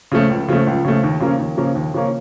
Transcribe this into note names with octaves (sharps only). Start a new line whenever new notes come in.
C#3 F3 A3
C#2
C#3 F3 A3
C#2
C#3 F3 A3
D#2
C#3 F3 A#3 C#4
D#2
C#3 F3 A#3 C#4
D#2
C#3 F3 A#3 C#4